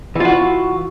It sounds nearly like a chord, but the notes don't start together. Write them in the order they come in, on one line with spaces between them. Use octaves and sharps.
E3 F4 F#4